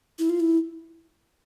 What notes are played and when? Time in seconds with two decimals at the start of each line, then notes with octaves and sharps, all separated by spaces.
0.19 E4
0.29 F4
0.40 E4